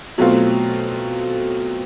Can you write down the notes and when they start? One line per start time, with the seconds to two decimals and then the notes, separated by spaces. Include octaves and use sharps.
0.18 B2 F#3 A3 C4 F4